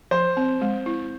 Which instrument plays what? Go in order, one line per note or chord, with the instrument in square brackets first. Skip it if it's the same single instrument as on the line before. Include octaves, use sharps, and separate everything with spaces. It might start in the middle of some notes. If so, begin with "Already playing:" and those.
[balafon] F3 [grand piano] C5
[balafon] C4
G#3
E4